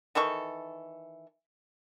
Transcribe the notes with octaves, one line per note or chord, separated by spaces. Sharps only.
D#3 E3 A4 C#6